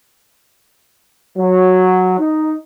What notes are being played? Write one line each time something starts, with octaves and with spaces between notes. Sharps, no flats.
F#3
D#4